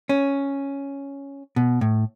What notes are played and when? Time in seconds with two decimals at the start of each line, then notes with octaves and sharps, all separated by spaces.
0.09 C#4
1.56 B2
1.81 A2